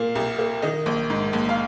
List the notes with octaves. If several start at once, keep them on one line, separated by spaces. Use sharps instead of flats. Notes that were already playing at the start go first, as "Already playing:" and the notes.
Already playing: A#2 A#3 F5
C2
A#3
D#3 D#5
A#1
G#2
A#1
F5